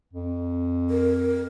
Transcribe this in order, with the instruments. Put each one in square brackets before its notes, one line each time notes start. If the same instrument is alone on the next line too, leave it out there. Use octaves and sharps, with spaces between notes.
[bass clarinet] F2
[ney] A#4